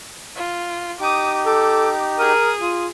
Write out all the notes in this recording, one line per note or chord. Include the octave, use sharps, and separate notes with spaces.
F4
D#4 G4 D6 D#6
A4 D6
G#4 A#4 D#6
F4